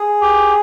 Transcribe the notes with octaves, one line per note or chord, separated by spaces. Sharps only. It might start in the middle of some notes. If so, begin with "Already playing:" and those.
Already playing: G#4
G4